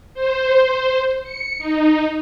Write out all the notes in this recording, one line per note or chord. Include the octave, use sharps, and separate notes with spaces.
C5
C#7
D#4